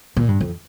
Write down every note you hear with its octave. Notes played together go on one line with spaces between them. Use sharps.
A#2
G2
F2